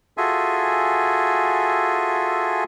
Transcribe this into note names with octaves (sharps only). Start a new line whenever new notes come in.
F4 F#4 G#4 A4 E5 G#5